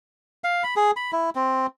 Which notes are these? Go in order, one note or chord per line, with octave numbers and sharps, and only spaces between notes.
F5
B5
G#4
B5
E4
C4